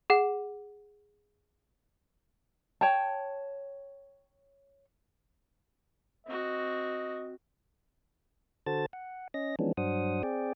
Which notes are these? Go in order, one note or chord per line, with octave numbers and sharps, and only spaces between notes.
G#4 F#5
C#5 G5 A5
C4 F#4 D#5
D3 F#4 A4 C5 A5 A6
F#5
C#4 D#5 A#6
E3 F3 G#3 B3 C#4 D4
G2 F#3 D4 C5 F#5 D#6
C4 G#4 D5 G5